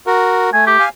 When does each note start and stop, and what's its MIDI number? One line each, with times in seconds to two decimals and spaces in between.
0.07 0.50 66
0.07 0.50 70
0.53 0.77 57
0.53 0.65 80
0.67 0.84 67
0.79 0.89 77
0.79 0.89 80